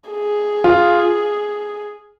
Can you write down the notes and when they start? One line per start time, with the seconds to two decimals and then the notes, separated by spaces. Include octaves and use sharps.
0.10 G#4
0.64 F4